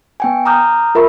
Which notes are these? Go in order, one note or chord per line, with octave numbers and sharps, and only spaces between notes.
B3 G5 G#5
A#5 D6 D#6 F6 G6
F4 A#4 E5 B5 C#6